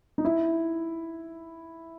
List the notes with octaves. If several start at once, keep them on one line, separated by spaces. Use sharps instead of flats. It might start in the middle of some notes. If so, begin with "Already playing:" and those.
D#4
E4